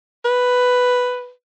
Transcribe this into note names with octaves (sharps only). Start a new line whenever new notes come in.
B4